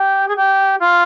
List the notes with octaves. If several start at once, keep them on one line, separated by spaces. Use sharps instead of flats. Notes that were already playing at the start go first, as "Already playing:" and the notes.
Already playing: G4
G#4
G4
F4